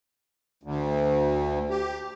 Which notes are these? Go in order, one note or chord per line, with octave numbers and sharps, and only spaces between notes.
D2
G4